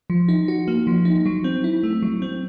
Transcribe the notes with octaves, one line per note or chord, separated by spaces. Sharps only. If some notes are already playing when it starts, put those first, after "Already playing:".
F3
D#4
F#4
A#3
F3
D#4
F#3
C4
E4
A3
F#3
C4